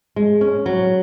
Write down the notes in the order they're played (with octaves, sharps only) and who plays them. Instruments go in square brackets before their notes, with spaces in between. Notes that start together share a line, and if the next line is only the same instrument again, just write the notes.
[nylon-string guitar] G#3
C#4
F#3